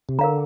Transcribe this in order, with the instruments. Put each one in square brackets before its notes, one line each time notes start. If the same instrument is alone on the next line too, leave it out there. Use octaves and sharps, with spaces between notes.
[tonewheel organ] C3
[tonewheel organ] D3 [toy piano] A#4 F5 A#5